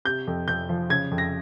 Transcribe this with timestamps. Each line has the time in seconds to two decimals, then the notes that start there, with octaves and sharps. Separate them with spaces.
0.05 C3 G6
0.27 F2
0.48 F2 G6
0.69 F3
0.90 C#3 G#6
1.11 F2
1.18 A#6